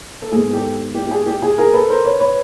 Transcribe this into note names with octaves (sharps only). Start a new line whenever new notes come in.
A4
G#2 D#3 G#3 B3 G#4
G4 A4
G4
G4
G#4
G4
G#4
G#4 A#4
A4 B4
A#4 C5
B4 C#5
B4 C#5